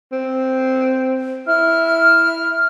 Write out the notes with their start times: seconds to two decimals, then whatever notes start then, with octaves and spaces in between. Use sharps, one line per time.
0.12 C4
1.47 E4 F6